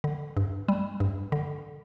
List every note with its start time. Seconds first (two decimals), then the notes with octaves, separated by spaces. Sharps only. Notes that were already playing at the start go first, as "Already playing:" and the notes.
0.04 D3
0.37 G2
0.68 G3
1.00 G2
1.32 D3